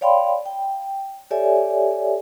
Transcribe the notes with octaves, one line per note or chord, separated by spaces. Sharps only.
C#5 D5 F5 G5 B5 C6
G5
G4 A4 C#5 D5 E5 G#5